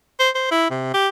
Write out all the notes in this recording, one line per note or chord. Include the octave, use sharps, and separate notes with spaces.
C5
C5
E4
C3
G4